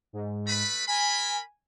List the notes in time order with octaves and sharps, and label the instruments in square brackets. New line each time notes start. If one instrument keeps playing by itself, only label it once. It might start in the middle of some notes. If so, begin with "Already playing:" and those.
[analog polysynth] G#2
[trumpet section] A3 B4 B5
[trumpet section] A#4 B5 [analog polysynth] G#5